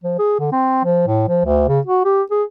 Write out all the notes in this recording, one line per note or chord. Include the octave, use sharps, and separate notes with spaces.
F3
G#4
D3
C4
F3
A2
F3
D2
C#3
F#4
G4
G#4